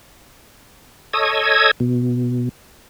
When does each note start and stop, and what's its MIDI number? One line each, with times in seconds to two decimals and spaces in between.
1.13 1.71 69
1.13 1.71 73
1.13 1.71 75
1.13 1.71 87
1.13 1.71 88
1.13 1.71 92
1.80 2.49 47